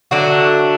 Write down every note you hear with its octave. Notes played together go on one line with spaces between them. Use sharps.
D3 F#3 A3 D4 F#4